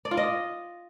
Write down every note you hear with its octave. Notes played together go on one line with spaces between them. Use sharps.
D5
F4
D#5